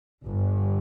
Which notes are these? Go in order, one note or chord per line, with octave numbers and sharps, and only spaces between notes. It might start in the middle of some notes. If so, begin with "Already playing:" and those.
G1 G2